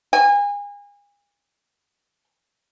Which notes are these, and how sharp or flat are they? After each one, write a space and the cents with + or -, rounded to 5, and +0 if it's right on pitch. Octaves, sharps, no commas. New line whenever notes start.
G#5 -35